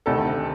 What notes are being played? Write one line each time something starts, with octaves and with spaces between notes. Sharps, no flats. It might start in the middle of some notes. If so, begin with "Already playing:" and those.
D2 C3 D#3 A4 A5